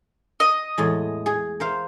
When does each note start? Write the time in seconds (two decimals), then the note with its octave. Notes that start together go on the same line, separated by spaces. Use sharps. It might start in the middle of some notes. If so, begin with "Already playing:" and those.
0.40 D#5
0.78 E2 A2 G#3
1.26 G#4
1.60 A#4 C5 F5